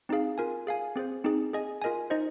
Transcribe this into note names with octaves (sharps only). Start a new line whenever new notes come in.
C4 D#4 G#4 F5
F4 A#4 G#5
G#4 F5 G#5
C4 G#4 C5
C4 D#4 G#4
G#4 D#5 G#5
F4 A#4 D#5 G#5
D#4 C5 D#5